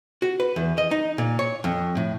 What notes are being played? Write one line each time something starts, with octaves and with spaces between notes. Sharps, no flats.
F#4
B4
E2
D#5
D#4
A#2
C#5
F2
A2